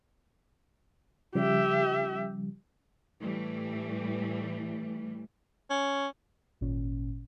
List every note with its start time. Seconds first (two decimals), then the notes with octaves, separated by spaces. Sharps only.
1.35 C#3 F3 G3 G4 E5
3.21 A2 E3 G3 A3
5.70 C#4
6.61 G#1 A#2 C#4